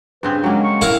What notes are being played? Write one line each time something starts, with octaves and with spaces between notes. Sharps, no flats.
G2 C#3 C4 B4
F#3 G#3 A#3 C#4
C#6
A2 E4 A#4 F5